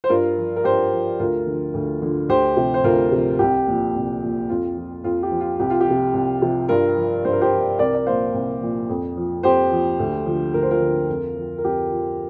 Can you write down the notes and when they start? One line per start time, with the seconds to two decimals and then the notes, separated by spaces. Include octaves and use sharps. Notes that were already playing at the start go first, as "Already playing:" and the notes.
0.04 C5
0.09 G2 F4 A#4
0.38 F3
0.56 A#4
0.64 G2 G4 C5
0.92 F3
1.19 D2 F4 A#4
1.47 D3 F3
1.74 D2
2.02 D3 F3
2.29 D2 G4 C5
2.57 C3 F3
2.74 C5
2.84 D2 F4 A#4
3.12 C3 F3
3.39 C2 G4
3.67 A#2 F3
3.95 C2
4.22 A#2 F3
4.49 F2 F4
4.77 F3
5.04 F2 F4
5.23 G4
5.32 F3
5.41 F4
5.59 C2 G4
5.70 F4
5.81 G4
5.87 C3 F3
6.14 C2
6.42 C3 F3
6.69 G2 F4 A#4
6.97 F3
7.25 G2 C5
7.33 A#4
7.41 G4 C5
7.51 F3
7.79 C2 A#4 D5
7.95 D5
8.06 A#2 F3 C5 F5
8.34 C2
8.62 A#2 F3
8.89 F2
9.17 F3
9.43 F2 G4 C5
9.71 F3
9.99 D2
10.26 D3 F3
10.54 D2 A#4
10.62 C5
10.71 F4 A#4
10.81 D3 F3
11.09 F2
11.36 F3
11.58 A#4
11.64 F2 G4
11.91 F3